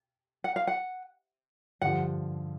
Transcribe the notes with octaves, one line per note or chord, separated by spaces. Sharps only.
F#5
F5
F#5
G2 D3 F3 F#5